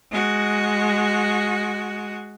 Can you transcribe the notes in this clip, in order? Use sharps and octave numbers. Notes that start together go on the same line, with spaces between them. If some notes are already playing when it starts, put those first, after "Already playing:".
G#3 F#4